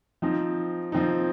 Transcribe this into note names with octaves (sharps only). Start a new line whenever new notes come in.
F3 C4 D#4
F3 C4 D#4